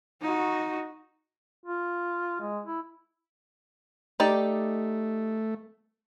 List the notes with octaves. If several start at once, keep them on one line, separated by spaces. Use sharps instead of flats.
D#4 F#4
F4
G#3
E4
A3 D#4 G4 D5